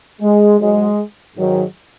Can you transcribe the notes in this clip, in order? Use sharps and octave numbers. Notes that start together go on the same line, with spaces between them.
G#3
G#2 F#3 G#3
G#2 D#3 F#3